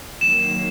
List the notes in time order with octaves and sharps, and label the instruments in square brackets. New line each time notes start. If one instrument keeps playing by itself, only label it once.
[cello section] D#3 F#3 A#3 [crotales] E7